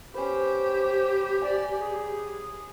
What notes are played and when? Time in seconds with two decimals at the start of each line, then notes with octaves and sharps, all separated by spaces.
0.14 C#4 G4 B4 C5
1.42 D5 G#5
1.79 G#4